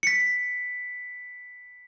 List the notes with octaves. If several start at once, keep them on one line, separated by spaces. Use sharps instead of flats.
B6 C#7